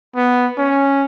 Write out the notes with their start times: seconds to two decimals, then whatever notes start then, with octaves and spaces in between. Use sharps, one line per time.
0.16 B3
0.58 C#4